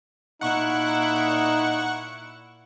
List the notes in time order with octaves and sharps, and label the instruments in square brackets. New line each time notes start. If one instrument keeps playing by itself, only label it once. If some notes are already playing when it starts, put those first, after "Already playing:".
[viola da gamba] A#2 E4 [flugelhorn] D#4 [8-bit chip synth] F#5 C#6 F#6